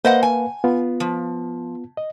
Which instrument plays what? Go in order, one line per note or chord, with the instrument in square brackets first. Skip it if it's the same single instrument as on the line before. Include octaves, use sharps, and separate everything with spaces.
[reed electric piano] A#3 B4 F5 [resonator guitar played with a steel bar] C5 D#5 F#5
[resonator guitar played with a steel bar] G#5
[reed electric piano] B3 F4
[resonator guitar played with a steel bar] F3
[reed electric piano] D#5